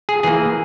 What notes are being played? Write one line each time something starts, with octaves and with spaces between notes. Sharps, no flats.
G#4
E3 A#3 G#4